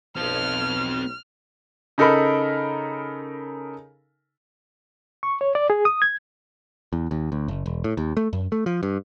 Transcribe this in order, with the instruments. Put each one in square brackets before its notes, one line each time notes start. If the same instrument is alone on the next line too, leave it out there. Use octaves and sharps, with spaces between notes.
[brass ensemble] B1 [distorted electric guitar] C4 A4 [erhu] F6
[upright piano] C#3 D#4 A4 A#4 B5
[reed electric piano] C#6
C#5
D5
G#4
D#6
G#6
[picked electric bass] E2
D#2
D2
F#1
E1
A2
D#2
A3
F#2
A3
F3
G2